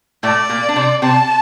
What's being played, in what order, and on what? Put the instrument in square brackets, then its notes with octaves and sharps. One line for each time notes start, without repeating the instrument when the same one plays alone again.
[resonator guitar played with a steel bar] A2 A3 [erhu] D5
[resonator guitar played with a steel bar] A#2 A#3
D4
C3 C4
[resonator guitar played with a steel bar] C3 C4 [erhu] A5